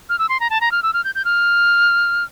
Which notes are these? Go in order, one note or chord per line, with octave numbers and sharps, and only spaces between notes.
F6
E6
C6
A#5
A5
A#5
F6
E6
F6
G6
G6
F6